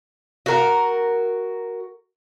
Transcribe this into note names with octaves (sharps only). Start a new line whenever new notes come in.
F#4 A#4